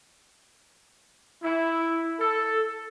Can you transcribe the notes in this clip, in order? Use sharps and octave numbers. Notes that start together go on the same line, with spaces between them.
E4
A4